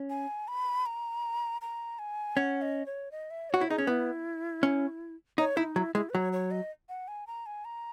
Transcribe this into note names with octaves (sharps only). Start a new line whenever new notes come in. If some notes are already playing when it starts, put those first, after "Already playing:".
Already playing: C#4
G#5
B5
A#5
A#5
G#5
C#4 F#5
D#5
C#5
D#5
E5
F#4 C#5
E4
D#4 G#4
C#4
B3 E4
C#4
D#4 C#5
D#4 E4
F#3 E4
G#3 E4
B4
F#3 C#5
C#5
D#5
F#5
G#5
A#5
G#5
A#5